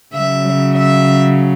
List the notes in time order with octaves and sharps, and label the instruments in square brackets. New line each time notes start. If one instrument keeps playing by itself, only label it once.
[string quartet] C#3 F#3 E5
E5